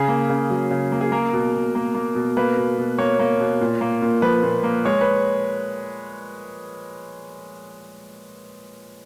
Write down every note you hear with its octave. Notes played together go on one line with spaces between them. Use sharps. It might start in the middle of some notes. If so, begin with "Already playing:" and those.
Already playing: C#3 G#4
A#3
C#3
F#3
C#3
A#3
G#4
A#3 A#4
B2
B2
A#3
A#3
B2
A#3 B4
B2
B2
A#3 C#5
A#3
B2
A#2
A#3
A#2
F3 B4
A#2
A#3
G#3 C#5
B4